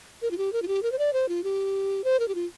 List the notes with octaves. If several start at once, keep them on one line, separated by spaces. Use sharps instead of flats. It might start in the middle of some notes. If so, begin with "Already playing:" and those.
A#4
F4
G4
A#4
F4
G4
A#4
C5
D5
C5
F4
G4
C5
A#4
G4
F4